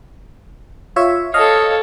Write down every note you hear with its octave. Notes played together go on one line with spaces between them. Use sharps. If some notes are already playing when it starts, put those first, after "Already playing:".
F4 C#5 E5
A4 C#5 D#5 F5